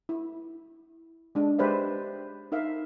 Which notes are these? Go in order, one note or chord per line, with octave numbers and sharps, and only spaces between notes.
E4
G#3 D4
G#3 G4 B4 C5 D5 E5
D#4 A#4 E5 F5